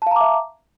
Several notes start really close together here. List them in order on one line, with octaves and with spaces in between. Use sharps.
A5 F5 A#5 D6 E5